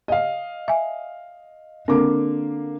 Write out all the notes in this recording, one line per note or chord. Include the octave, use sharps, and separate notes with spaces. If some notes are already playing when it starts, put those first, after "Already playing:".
D#5 F5
E5 G#5
D3 A#3 C4 D6